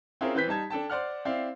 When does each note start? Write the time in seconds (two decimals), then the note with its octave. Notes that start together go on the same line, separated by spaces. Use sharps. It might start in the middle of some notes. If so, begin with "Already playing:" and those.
0.21 C4 C#4 E4 F4 G#4 A#4
0.35 E3 C4 B4 G6 B6
0.48 G3 D#4 A5 G#6
0.70 D4 A4 G5 A5
0.90 C5 D5 F#5 F6
1.25 C4 E4 D5 F5